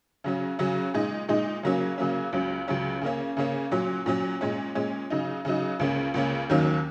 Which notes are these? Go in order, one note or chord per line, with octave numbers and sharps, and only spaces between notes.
C#3 F#3 C#4
C#3 F#3 C#4
A#2 G#3 D#4
A#2 G#3 D#4
C#3 F#3 A#3 C#4
C#3 F#3 A#3 C#4
C#2 C#3 F#3 C#4
C#2 C#3 F#3 C#4
C#3 A#3 C#4
C#3 A#3 C#4
A#2 F#3 C#4
A#2 F#3 C#4
A#2 G#3 C#4
A#2 G#3 C#4
C#3 F#3 D#4
C#3 F#3 D#4
C#2 C#3 A#3 C#4
C#2 C#3 A#3 C#4
D#2 D#3 F#3 A#3 C#4